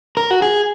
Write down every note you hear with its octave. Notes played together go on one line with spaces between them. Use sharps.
A#4
F#4
G#4